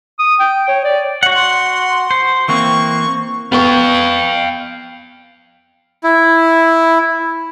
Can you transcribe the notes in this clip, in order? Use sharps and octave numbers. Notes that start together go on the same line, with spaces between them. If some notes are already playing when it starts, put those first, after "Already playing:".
D#6
G5
C#5
D5
F#4 F#5
C6
C5
E3 A#3 C4 C#6
B3 F5 G5 C#6
E4